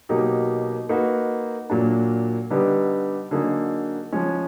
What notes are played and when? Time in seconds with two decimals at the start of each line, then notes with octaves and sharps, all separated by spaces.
0.09 B2 F#3 A#3 D#4 G4
0.89 A#3 D#4 F#4 B4
1.70 A#2 F#3 A#3 D4
2.50 D3 G3 B3 D#4 G4
3.31 D3 F#3 A#3 D#4 G#4
4.12 F3 G#3 C#4